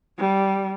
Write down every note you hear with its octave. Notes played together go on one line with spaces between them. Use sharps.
G3